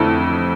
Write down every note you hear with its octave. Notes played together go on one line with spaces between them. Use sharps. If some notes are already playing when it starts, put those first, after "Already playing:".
Already playing: F2 D3 A3 E4